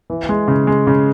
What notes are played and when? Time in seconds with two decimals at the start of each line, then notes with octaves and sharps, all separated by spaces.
0.10 E3
0.29 G#3
0.48 C#3
0.67 G#3
0.87 C#3